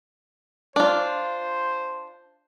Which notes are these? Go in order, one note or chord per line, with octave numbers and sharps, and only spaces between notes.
D4 F4 C5